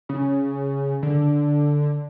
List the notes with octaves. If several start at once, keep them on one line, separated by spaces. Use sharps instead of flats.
C#3
D3